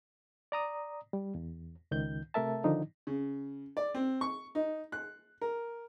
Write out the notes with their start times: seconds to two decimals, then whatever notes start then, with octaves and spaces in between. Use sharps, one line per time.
0.52 D5 A#5 D#6
1.13 G3
1.35 E2
1.91 C#2 D#3 G6
2.34 C3 A3 A#4 E5 A5
2.64 D3 D#3 F3 D4 D#4
3.07 C#3
3.77 D5
3.95 C4
4.21 C#6
4.55 D#4
4.92 F#6
5.41 A#4